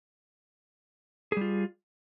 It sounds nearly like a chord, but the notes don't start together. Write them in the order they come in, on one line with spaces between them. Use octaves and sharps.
G#4 G3 F4